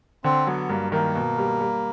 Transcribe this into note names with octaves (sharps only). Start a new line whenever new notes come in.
D3 C4
F#3 B3
G2 A#3
D#3 A#3
B2
G3
G3